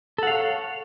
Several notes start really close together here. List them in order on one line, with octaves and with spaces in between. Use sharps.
A4 F#5 F5 C#5